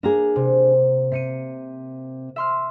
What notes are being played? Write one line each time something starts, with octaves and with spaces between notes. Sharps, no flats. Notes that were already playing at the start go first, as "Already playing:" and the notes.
A#3 D4 G#4 A#5
C3
C3 C7 C#7 D#7
E5 C6 F6